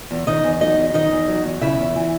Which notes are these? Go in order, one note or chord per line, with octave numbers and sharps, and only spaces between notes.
E2
D#3 D#4 D#5
E2
F#3 D#4 D#5
E2
D#3 D#4 D#5
E2
F#3
E2
C#3 E4 E5
E2
E3